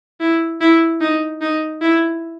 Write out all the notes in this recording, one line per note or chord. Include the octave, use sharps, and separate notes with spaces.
E4
E4
D#4
D#4
E4